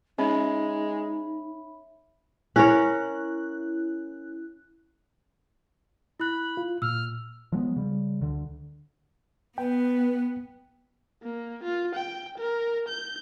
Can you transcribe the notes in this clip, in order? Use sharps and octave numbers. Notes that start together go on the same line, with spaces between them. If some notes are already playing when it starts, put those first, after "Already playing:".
G#3 C#4 D#4 C#5 E5 B5
C#4 E4 A#4 C#5 F#6
E4 B5 F#6
F4
A#2 E6 F6
F3 F#3 G#3 B3
C#3 G3
D2 D3
B3 B4 G5
A#3
F4
G5
A#4
G6